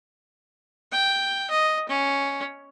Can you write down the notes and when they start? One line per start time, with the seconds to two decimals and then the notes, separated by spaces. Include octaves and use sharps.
0.92 G5
1.50 D#5
1.89 C#4